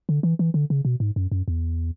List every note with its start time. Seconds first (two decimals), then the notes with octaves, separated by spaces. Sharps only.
0.09 D3
0.23 E3
0.39 E3
0.54 D3
0.70 C#3
0.85 B2
1.00 G#2
1.16 F#2
1.32 F#2
1.48 E2